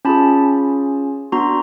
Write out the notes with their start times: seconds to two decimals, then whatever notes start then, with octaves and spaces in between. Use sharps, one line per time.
0.05 C#4 F4 G#4 A5 B5
1.32 B3 D4 F#4 A#5 C6